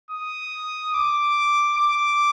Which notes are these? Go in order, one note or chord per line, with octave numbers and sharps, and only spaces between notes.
D#6
D6
D6